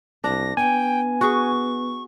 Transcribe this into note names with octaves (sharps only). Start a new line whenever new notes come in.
C2 D4 A#6
B3 G5 G#5
F#4 G#4 C#6